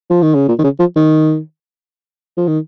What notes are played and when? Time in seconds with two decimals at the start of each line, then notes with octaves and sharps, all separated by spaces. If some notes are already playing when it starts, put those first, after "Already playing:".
0.10 F3
0.22 D#3
0.35 C#3
0.48 A#2
0.59 D#3
0.64 C#3
0.79 F3
0.96 D#3
2.37 F3
2.48 D#3